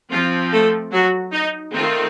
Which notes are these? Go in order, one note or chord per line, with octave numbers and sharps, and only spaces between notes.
F3 C4 F4
A3 A4
F#3 F#4
D#4
D#3 A3 C4 F4